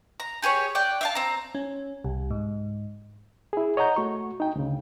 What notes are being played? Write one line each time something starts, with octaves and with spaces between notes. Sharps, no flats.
A#5
G4 G#4 A#4 C#5
D5 F#5 G5
E5 F5 A5
C4 A#5
C#4
C2
G#2
E4 G#4
C#5 D#5 F#5 A#5 G6
A3 F#4 C#6
D#4 G5
D2 C#3